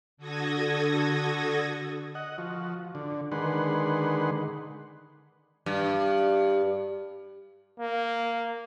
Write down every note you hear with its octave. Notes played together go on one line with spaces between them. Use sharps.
D3 F#4 A4 D#6 G#6 A#6
D#5 F#5
F3 F#4
D3
D3 D#3 G#3 B4 F#5 C6
G2
A#3